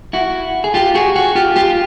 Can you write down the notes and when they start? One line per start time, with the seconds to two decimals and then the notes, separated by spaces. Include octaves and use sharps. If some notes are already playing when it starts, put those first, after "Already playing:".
0.13 E4 F#4
0.64 G#4
0.74 F4 G4
0.95 F#4 G#4
1.16 F#4 G#4
1.35 F4 G4
1.56 F4 G4